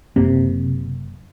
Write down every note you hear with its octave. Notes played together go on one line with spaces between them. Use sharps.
F#1 F#2 C3 A#3